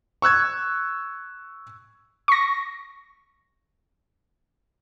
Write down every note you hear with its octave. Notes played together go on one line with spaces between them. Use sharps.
C#6 E6 F#6 G#6
C#6 A#6